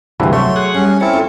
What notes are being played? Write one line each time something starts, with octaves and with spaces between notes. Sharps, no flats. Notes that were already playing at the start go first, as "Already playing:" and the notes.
D2 G2 C3 E3 F4 G#4
F#3 A3 C#5 E5 C6
G#4 F#5
G3 C#4
C4 C#4 E4 A4
F4